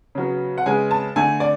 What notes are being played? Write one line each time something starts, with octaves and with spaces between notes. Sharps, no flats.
C#3 F#3 B3
F#5
C#3 G#3 B3 G#5
A5
D3 A3 G#5
D5